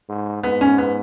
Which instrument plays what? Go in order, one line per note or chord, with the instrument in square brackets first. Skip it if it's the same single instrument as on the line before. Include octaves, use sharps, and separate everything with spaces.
[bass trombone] G#2
[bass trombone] G#2 [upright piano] B3
[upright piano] C#4
B3